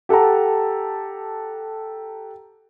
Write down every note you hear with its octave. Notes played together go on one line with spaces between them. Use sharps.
G4 A4 F#5 A5 A#5